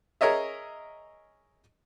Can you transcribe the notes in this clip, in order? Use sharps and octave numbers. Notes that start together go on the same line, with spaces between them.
G#4 A#4 C#5 D#5 E5